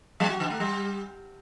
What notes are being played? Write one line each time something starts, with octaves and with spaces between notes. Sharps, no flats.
F#3
F#4
D3
A3
G3